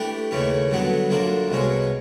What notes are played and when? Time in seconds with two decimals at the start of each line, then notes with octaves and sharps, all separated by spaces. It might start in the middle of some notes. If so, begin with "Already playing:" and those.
Already playing: E3 A3 D4 G4
0.31 D#2 C#3 E3 A3 C#4
0.70 G2 D3 F#3 B3 D4
1.09 F#2 D3 F3 A#3 D4
1.49 C2 B2 G#3 C#4